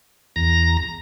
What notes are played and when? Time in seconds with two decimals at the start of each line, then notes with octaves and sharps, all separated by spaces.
0.36 E2 A#5 A#6